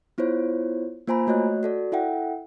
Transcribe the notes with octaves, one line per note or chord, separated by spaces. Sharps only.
B3 E4 F4 C5 C#5
A#3 F4 C5 G#5 A#5 B5
A3 F#4 C#5 D#5 F#6
F#4 A4 D5
E4 A4 E5 F#5 G5